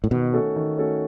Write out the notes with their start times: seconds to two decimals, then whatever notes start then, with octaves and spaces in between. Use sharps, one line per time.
0.04 A2
0.11 B2 D#3
0.33 A3 C#4 F#4 A4
0.56 D#3
0.78 A3 C#4 F#4 A4